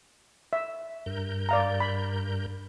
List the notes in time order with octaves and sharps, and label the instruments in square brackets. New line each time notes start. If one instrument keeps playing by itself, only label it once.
[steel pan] E5
[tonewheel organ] G2 A#4 G6
[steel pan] D5 F5 A#5
B5